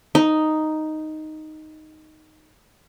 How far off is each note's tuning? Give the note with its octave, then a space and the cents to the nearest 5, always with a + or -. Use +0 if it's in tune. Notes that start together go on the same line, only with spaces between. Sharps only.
D#4 +0